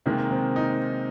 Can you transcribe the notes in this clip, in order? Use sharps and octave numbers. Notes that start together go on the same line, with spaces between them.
C3 D#3 G#3 A#3
C4
D#4